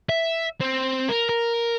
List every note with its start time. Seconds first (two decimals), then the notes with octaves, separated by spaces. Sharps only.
0.09 E5
0.61 C4
1.09 A#4
1.29 A#4